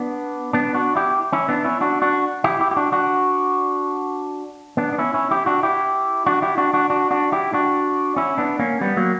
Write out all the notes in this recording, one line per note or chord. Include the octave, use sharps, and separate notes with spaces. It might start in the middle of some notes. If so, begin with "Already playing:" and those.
Already playing: B3 D4
B3 D4
D4 F#4
E4 G4
C#4 E4
B3 D4
C#4 E4
D4 F#4
D4 F#4
E4 G4
E4 G4
G4
D4 F#4
D4 F#4
B3 D4
D4
C#4 E4
C#4 E4
E4 G4
D4 F#4
E4 G4
D4 F#4
E4 G4
D4 F#4
D4 F#4
D4 F#4
D4 F#4
E4 G4
D4 F#4
C#4 E4
B3 D4
A#3 C#4
G3 B3
F#3 A#3